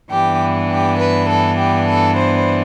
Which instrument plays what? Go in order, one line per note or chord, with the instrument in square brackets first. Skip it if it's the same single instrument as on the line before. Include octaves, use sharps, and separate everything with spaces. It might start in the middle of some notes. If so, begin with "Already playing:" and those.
[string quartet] G2 E3 B3 D4 G4
G4
B4
A4
G4
A4
C5